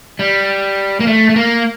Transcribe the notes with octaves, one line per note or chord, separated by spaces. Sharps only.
G3
A#3
A3
A3
A#3